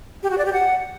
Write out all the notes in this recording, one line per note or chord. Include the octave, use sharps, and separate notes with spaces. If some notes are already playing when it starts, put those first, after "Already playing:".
G4
F#4
D5
G4
F#5